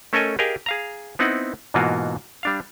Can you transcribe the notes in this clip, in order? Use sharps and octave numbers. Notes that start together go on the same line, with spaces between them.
A3 C#4 A4 A#4 D#5 G#5
G4 G#4 A#4 D#5 F5 G#5
G#4 F5 A#5
B3 C4 D#4 E4 F#5
G#2 B2 E3 A#3 F4 F#4
G3 D4 F5